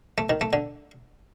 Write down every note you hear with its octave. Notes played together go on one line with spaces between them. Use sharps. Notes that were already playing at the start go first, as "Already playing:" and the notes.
A3
D#3
A3
D3